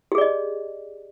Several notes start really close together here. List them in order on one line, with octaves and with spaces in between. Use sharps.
G4 G#4 D5 D#5